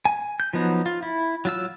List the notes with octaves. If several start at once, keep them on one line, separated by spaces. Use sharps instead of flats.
G#5
G6
F3 F#3 B3 D#4
F4
E4
F#3 F4 E6